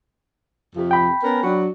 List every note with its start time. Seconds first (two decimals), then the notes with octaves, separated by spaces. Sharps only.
0.76 F2 C3 F3
0.91 G5 B5
1.23 B3 C#4 A#4
1.43 F#3 D4 F#4